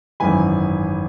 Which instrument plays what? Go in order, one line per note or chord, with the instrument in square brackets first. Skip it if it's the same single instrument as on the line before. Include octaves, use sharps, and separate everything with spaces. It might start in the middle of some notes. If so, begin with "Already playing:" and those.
[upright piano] G#1 F#2 E3 G#5 B5